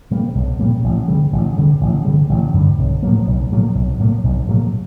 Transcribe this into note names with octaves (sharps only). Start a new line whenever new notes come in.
A#2 G3 A#3
B1
A#2 G3 A#3
A1
G2 D3 G3
A1
G2 D3 G3
A1
G2 D3 G3
A1
G2 D3 G3
B1
A2 F#3 A#3
B1
A2 F#3 A#3
B1
A2 F#3 A#3
B1
A2 F#3 A#3